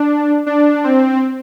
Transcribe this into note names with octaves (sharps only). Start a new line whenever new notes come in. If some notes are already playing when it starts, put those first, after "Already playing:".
Already playing: D4
D4
C4